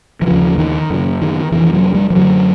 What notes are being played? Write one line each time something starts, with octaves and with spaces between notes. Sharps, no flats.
E3
D#2 C#3 F3
D#3
F#2 C#3
D#3
F2 C3 E3
F#3
G3
F3
F#2 D3 F#3